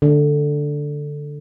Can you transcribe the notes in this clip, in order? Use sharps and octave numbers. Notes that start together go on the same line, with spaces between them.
D3